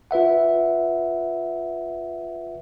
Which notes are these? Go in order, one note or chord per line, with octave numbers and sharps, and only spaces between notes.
F4 B4 E5 F#5